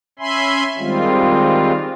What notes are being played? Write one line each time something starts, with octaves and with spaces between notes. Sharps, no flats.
C#4 E5 G#5 B5 C6
D#3 G3 G#3 C4 F4